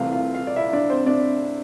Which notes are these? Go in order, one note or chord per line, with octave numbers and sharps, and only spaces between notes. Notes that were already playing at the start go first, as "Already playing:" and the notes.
Already playing: C2 C3 E3 A3 F4 F5
F4 F5
F4 F5
D5
E4 E5
D4 D5
C4 C5
D4 D5